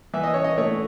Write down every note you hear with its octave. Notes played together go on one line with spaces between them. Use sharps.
E3 E5
D#5
C#4 C#5
D#5
A3 C#5